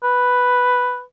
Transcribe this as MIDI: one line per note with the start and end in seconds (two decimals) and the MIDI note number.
0.03 1.02 71